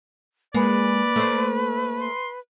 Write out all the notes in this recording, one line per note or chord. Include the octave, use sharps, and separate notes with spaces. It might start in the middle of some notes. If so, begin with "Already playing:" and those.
G#3 A#3 B4 D5
A3 C5
C6